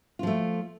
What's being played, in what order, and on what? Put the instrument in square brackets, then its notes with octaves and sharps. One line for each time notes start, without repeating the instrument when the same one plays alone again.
[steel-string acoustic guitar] F4
F3
A3